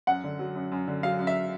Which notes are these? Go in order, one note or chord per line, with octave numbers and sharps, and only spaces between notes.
F#2 F#5
D3
F#3
F#2
F#2
D3
F#3 F5
F#2
E5